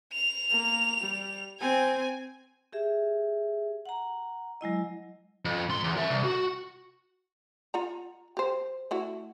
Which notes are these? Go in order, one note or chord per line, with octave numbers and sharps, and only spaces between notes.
F7
A#3
G3
C4 G#5
G4 G#4 E5
F#5 A#5
F#3 G#3 E4 D#5
F2
G#2 C6
E2
A#4 E5
C2
F#4
F4 F#5 A#5
G4 C5
A3 E4 F#4